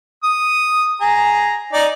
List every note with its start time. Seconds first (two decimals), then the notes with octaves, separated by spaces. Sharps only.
0.24 D#6
1.01 G#4 A#5
1.73 D#4 D5